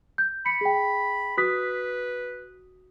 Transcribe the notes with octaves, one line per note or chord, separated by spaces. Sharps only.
G6
B5 C#7
G#4 G5
F#4 B4 D#6 B6